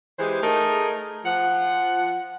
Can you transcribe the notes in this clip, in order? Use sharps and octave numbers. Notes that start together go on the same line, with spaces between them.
E3 G#3 G4 G#4 C5
A3 D#4 G#4 A#4
F3 F#5